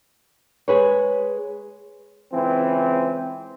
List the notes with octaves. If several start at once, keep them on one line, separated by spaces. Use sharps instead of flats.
G#3 G#4 B4 C#5
C#2 E3 C4